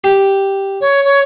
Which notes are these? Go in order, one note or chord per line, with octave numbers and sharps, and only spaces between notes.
G4
C#5
C#5